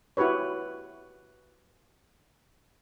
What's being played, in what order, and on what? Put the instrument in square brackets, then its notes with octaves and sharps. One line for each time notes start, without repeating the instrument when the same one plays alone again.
[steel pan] E4 F#4 G4 B4 C#5